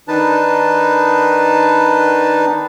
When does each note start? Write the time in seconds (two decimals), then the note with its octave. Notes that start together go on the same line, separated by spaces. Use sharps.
0.08 D#3 D4 D#4 B4 A5